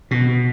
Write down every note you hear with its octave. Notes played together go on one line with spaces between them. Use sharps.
B2